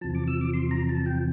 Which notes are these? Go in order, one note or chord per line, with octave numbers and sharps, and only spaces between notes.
E2 C3 F3 A5
D6
E6
D6
C6
A#5
A5
G5